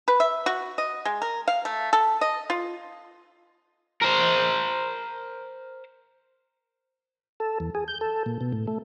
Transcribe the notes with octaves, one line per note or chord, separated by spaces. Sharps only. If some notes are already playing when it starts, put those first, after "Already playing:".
B4
E5
F#4
D#5
G#3
A#4
F5
A3
A4
D#5
F4
A#4 C5
A4
E2
G#4
G6
A4
A#2
B2
A2
A3